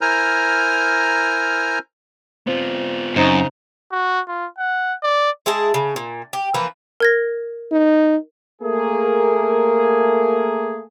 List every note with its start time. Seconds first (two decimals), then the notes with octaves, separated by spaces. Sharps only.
0.01 E4 A#4 C5 G#5 A#5 F6
2.47 B3 C4 F4
3.16 F#2 C#3 C4 D#4
3.92 F#4
4.27 F4
4.58 F#5
5.03 D5
5.46 G#3 E4 G#4 A5
5.74 C#3
5.96 A#2
6.33 G4
6.54 E3 F3 A#3 B4
7.00 A#4 G#6 A#6
7.72 D#4
8.62 A3 A#3 G#4